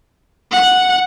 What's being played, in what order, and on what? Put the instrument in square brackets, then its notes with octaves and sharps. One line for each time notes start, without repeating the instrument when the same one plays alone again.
[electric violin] F#5